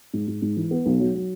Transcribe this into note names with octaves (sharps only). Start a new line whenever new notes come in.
G#2
G#2
G#2
E3
B3
B1
F#3
F#3